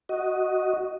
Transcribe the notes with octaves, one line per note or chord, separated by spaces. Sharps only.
F#4 D#5